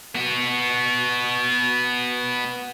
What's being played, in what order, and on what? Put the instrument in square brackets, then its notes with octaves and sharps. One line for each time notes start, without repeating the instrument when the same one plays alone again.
[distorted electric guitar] B3 F#4